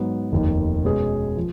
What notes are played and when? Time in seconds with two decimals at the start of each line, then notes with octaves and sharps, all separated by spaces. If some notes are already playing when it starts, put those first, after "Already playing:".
Already playing: G#2 F#3 B3
0.32 F1 D#2 D#3
0.84 B2 G#3 C#4 G#4 B4
1.37 F3